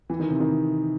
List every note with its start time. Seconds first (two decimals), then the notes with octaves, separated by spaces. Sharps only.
0.10 E3
0.20 D#3
0.30 C3
0.40 D#3